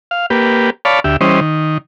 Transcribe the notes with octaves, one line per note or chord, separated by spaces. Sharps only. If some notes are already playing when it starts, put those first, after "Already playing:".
F5
A#3 G4 B4
C#5 D5 F5 A5 B5
D2 G4 E5
E3 G3 C#4 C5 D#5
D#3